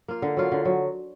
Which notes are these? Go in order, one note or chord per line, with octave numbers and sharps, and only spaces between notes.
A#3 F4
D3
F#3 A#3 F4
D3
F#3